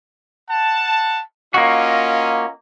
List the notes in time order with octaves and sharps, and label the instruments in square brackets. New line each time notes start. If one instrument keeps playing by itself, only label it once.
[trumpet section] F#5 A5
[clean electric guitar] A#3 F#4 [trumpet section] C#4 F4 D#5